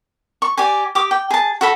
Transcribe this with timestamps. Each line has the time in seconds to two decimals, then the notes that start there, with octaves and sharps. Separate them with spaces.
0.42 C#6
0.57 G4 D5 G#5
0.95 G4 D6 D#6
1.11 G5
1.30 G#4 A5
1.61 F#4 A4 B5